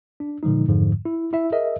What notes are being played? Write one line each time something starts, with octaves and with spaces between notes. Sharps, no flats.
D4
A#2 D3 F3 G#3 D#4
F2 G#2 D3 F3
E4
E4 E5
G#4 A#4 D#5 E5